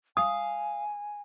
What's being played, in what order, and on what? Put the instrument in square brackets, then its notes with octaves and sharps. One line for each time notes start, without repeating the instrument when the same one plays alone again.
[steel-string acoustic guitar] F5 [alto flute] G#5 [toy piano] D#6